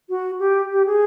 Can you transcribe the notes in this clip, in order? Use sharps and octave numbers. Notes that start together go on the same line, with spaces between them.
F#4
G4
G4
G#4